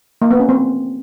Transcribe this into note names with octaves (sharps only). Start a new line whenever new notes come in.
A#3
B3
C#4
C4